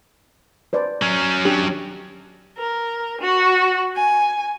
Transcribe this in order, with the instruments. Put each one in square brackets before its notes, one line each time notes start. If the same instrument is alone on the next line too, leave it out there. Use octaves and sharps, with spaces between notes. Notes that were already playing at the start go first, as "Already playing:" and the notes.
[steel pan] B4 C5 D5
[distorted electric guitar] F#3 C#4
[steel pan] D4 G4
[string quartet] A#4
F#4
G#5